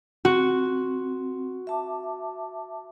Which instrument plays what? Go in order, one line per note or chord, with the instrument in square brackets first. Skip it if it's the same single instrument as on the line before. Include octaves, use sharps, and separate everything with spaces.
[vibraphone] C4 [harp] F#4
[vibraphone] E5 A5 D6